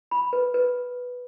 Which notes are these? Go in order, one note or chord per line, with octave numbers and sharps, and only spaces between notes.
B5
B4
B4